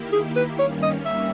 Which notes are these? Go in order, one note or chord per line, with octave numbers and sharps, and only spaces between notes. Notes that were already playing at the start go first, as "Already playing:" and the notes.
Already playing: D#3 A#3 E4 G4
G#4
B4
G2 D#3 G3 A#3 C#4 C#5
D#5
E5